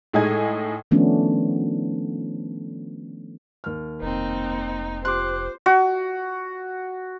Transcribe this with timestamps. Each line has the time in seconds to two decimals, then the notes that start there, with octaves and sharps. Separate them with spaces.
0.14 A2 G#3 D#4 D#5 G#5 G#6
0.91 D#3 F3 A3 B3 C#4 D4
3.64 D#2 F6
4.02 F1 A#3 C4 D#4
5.05 F4 G4 C5 C6 D6 F#6
5.66 F#4